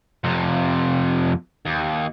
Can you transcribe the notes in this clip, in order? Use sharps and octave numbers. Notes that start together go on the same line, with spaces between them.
F2 C3
D#2